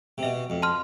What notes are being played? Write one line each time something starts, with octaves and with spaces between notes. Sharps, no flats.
C3
B2 E5
F2
A5 C6 F6